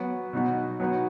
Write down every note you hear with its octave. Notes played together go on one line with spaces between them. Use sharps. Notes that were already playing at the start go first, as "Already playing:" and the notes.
Already playing: F#3 B3 F#4
B2 F#3 D#4 F#4
F#3 B3 D#4 F#4